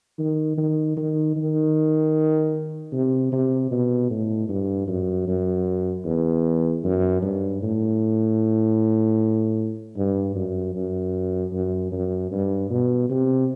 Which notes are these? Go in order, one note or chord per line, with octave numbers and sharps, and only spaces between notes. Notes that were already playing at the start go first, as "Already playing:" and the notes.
D#3
D#3
D#3
D#3
C3
C3
B2
A2
G2
F#2
F#2
E2
F#2
G2
A2
G2
F#2
F#2
F#2
F#2
G2
B2
C3